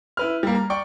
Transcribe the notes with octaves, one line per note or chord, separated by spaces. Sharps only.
E4 B4 F6
G3 A#3
A#5
D5 G5 C#6